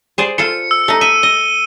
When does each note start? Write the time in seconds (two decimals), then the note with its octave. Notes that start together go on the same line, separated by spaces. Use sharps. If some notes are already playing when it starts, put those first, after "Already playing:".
0.18 G#4 C5 D5
0.38 F4 A4 C5 C#7
0.71 E6
0.88 A3 D#4
1.01 E5 D#7
1.23 D#5 G7